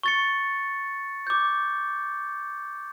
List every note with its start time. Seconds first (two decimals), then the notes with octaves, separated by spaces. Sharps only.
0.03 C#6 A6 C#7
1.27 D6 G6